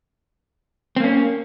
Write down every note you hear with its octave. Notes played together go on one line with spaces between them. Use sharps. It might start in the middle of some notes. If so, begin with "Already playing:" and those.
A#3 C4 C#4